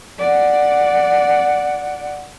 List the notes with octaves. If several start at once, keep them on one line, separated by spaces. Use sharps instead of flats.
D5 F#5